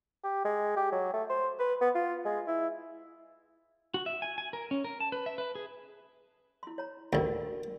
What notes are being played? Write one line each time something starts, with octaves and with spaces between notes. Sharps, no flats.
G4
G#3
G4
F#3
A3
C5
B4
B3
F4
G#3
E4
F#4
E5
G#5
G#5
A#4
C#4
A#4
A5
B4
E5
B4
G#4
E4 C6
C#5 A#5
A1 D2 D4 A#4 D5
F#4